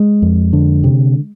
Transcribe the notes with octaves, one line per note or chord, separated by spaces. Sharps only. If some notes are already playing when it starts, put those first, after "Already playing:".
Already playing: G#3
F2
D3
C3